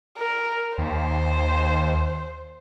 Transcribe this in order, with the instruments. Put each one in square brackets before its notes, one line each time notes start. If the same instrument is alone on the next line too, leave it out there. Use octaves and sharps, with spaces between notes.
[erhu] A#4
[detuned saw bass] D#2 [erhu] C5